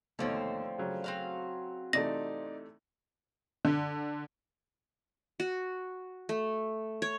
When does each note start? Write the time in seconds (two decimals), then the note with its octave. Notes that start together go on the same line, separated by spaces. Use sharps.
0.19 D#2 B2 D3 F3 A3 C4 C#5
0.78 C#3 F#3 C#4
1.04 C4 F#4 F5
1.93 C3 E3 A3 D#4 D5 A#6
3.65 D3
5.40 F#4
6.29 A3
7.02 C#5